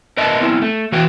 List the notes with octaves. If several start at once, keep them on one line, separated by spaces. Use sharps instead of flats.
A#4 B4 D#5 E5 A5
B3 C4 E4
A3
E3 F#4 B4 G5